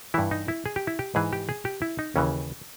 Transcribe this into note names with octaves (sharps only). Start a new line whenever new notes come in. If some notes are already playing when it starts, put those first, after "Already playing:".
G2 E3 E4
D#4
E4
G#4
G4
E4
G4
G#2 E3 G#4
G4
G#4
G4
E4
D#4
D#2 C#3 E3 C#4